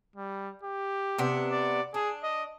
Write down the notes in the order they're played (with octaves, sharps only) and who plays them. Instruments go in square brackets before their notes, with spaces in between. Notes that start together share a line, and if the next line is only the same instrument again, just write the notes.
[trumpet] G3
G4
[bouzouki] C3 B3 D4
[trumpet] D5
[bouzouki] D4 [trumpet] G#4
[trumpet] D#5